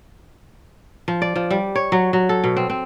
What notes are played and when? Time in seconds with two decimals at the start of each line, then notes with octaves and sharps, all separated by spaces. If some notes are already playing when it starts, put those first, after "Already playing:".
1.08 F3
1.22 D5
1.36 F3
1.51 G3
1.76 C#5
1.92 F#3
2.13 F#3
2.29 A4
2.44 B2
2.57 C4
2.70 C4